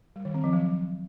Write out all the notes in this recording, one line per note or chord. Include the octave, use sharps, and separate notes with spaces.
G3
D#3
C4
F3
F#3